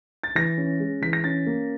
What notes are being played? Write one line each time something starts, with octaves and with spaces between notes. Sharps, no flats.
A6
E3 A#6
C#4
G#3
E3 B6
A#6
C#4 A6
A#3